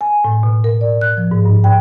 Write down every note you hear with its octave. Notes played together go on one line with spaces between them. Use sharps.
G#5
A2
B2
A#4
D5
F#6
F3
G#2
G2
G5